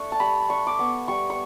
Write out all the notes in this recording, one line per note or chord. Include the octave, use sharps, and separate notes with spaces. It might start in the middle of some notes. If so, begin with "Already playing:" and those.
Already playing: A3 D4 C#6
A5
G3 B5
D4 C#6
D6
B3 C#6
G3 C#6
C#6